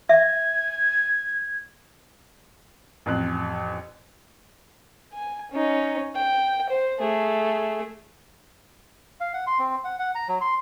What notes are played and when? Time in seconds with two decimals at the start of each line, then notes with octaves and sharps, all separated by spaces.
0.09 E5 G#6
3.06 A1 F2 F#6
5.13 G#5
5.51 C#4 D#4
6.15 G5
6.69 C5
6.99 A3 G#4
9.20 F5
9.34 F#5
9.47 C6
9.59 C4
9.84 F#5
9.99 F#5
10.15 A#5
10.29 F#3
10.41 C6